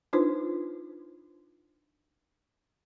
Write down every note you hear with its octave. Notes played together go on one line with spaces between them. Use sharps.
D4 D#4 F4 B4 C5